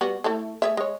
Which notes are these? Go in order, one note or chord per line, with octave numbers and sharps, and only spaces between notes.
G3 B3 F#4
A3 E4 A4
A3 G#4 E5
G#3 C#5